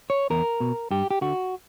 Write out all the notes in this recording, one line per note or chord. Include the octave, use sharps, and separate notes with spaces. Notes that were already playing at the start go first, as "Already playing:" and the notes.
C#5
E2 A#4
B2
G2 G4
G4
D3 F#4